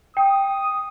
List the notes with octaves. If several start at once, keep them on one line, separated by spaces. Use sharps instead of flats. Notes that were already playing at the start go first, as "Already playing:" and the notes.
G5 D#6